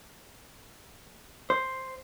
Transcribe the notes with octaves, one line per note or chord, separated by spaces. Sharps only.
C5